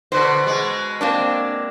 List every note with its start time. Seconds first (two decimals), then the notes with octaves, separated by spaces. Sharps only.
0.12 B2 D3 B4 C5
0.44 B2 G#3
1.01 A#3 C4 D4